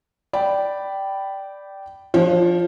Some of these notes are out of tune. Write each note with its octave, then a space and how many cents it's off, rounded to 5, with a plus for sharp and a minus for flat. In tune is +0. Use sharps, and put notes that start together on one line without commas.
D5 +0 G5 -15 B5 +0
F3 +0 D4 +10 C5 +40